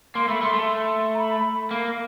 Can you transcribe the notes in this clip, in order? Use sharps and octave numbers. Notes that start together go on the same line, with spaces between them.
A#3 C6
A3 B5
A3 C6
A3
A#5
B5
A#3